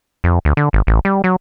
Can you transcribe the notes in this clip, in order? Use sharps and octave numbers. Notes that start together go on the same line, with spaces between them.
F2
D2
D3
G#1
A1
G3
F#3